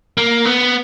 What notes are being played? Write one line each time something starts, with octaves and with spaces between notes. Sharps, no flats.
A#3
B3